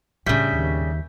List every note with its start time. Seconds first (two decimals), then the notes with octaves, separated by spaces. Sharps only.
0.26 A2 C#3 G3 D4 E5 G6 B6
0.53 D#2